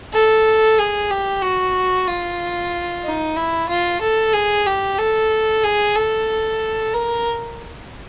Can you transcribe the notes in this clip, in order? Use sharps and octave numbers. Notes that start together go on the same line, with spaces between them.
A4
G#4
G4
F#4
F4
D#4
E4
F4
A4
G#4
G4
A4
G#4
A4
A#4